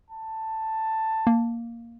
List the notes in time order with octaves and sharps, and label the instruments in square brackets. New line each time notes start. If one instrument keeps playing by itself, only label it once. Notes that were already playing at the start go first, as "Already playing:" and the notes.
[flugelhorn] A5
[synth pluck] A#3